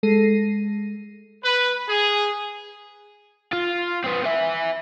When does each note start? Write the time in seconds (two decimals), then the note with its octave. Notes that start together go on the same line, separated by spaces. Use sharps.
0.03 G#3 A4 A#6 C7 D#7
1.45 B4
1.89 G#4
3.53 F4
4.04 C4 B4
4.24 B4 E5